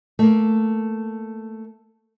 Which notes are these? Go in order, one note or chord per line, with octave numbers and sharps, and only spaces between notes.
A3 A#3